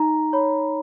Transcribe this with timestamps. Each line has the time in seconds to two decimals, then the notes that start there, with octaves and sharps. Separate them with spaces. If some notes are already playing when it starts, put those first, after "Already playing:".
Already playing: D#4 A#5
0.33 C#5 B5